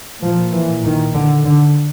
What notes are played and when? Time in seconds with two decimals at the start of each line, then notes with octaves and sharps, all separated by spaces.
0.22 A#2 F3
0.53 E3
0.83 D#3
1.14 D3
1.45 D3